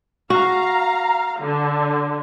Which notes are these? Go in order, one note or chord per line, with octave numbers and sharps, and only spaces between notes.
F#4 F5 A#5
D3